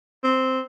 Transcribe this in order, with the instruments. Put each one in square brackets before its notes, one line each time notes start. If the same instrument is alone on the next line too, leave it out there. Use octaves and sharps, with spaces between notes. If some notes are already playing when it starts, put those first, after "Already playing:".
[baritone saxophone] C4